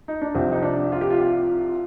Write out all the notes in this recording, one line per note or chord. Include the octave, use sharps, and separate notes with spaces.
D#4
D4
C2 C3 F3 C4
D#4
D4
F4
G4
F4
F4